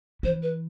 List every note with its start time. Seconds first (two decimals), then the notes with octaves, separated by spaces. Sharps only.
0.23 E3 C5
0.42 B4